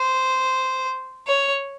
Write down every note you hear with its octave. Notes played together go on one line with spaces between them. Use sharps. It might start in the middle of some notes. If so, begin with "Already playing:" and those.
Already playing: C5
C#5